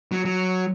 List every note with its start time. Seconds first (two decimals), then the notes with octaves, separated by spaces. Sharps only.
0.12 F#3
0.25 F#3